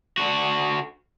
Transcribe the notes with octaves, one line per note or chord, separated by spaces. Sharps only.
D3 F#4